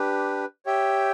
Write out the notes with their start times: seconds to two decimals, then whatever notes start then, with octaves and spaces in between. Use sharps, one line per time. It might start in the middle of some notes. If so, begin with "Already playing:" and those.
Already playing: D4 G4 B4
0.66 G4 C#5 E5 G5